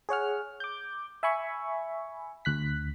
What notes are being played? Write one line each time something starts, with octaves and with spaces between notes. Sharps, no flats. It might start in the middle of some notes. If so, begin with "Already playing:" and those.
G#4 C#5 F#5 F6
D6 G6
E5 G#5 B5 C#6
D2 F#6 B6